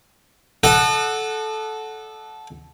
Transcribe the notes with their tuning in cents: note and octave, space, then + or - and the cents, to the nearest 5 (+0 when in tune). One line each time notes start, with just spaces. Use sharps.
A4 -15 D#5 -45 F#5 +0